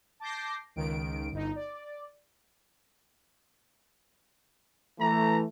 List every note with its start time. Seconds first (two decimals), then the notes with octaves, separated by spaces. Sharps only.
0.20 A5 D6 G6 A#6 C7
0.76 C#2 D#3 D7
1.32 G1 D#4
1.56 D5
5.00 E3 A3 A#5